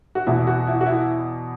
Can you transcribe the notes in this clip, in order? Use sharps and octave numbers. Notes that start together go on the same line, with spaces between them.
F#4
E2 B2 E4
F#4
E4
F#4
E4